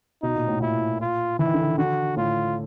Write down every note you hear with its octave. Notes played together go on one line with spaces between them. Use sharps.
B2 D#4
A#2
A2
A#2 E4
F4
E3 E4
D#3
D3
D#3
D3 F#4
A2 F4